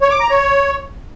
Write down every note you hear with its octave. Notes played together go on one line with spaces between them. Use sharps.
C#5
D6
A#5
C#5